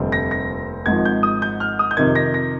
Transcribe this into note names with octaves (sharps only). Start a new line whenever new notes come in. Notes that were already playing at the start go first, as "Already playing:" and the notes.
Already playing: F1 D#2 D3 G3 C4
A#6
A#6
G#1 G#2 F3 G#6
G6
D#6
G6
F6
D#6
G6
F2 C3 D#3 G#6
A#6
A#6